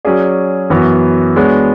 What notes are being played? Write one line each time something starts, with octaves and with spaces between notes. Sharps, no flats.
F#3 C#4 G#4 D5
F#2 E3 B3 F#4
G#3 B3 D4 F#4 C#5